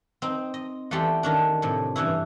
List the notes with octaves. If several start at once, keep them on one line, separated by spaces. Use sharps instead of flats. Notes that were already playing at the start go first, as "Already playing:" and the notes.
C4 D#4
D#5
E2 A3 B3 G4 D5 C6
D#3 C#4 D4
A2 C3
G2 E3 C#4 E4